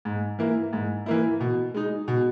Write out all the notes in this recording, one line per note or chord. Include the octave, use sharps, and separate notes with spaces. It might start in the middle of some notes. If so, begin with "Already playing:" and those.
G#2
E3 A#3 E4
G#2
E3 A#3 E4
B2
G#3 D#4
B2